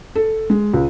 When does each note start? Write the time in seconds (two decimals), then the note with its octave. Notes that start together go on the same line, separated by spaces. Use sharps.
0.16 A4
0.50 G#3
0.74 C#2